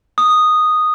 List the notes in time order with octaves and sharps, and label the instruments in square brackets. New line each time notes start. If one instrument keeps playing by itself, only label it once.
[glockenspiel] D#6